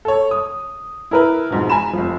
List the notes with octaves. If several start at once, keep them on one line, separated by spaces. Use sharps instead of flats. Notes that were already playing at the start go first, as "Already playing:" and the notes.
A4 C#5
D#6
E4 A#4 B4
F2 G#2 B2
G#5 A#5 B5 E7
F1 F3